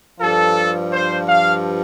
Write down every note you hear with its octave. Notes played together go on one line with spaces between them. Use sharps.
G2 F3 A4
C5
F5